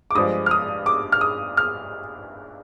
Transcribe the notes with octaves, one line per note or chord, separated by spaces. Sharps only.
D6
G2 F3 G#3 D#6
F6
D#6
D6
F6
D#6
F6